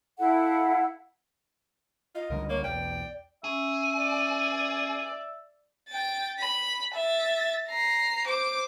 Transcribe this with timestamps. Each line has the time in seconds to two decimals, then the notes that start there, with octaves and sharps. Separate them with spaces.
0.19 E4 A4 F5 F#5
2.15 F4 D#5
2.30 C#2 D3 G3 A#4
2.49 A#3 C#5
2.64 B1 E2 D5 G5
3.44 C#4 G#4 E5
3.99 D5
5.88 G5 A6
6.39 B5
6.94 E5 A6
7.69 A#5 C7
8.27 C5 D6